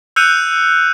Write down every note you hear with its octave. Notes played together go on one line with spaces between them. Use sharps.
E6 F#6 G6 C#7 D#7 F7